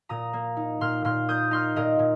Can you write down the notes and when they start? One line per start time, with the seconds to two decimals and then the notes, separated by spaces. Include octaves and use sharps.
0.09 A#2 A#5 D#6
0.33 A#3
0.57 D#4
0.81 A#2 C6 F6
1.05 A#2 C6 F6
1.29 A#3 D#6 G6
1.51 D#4 C6 F6
1.76 A#2 A#4 D#5
1.99 A#2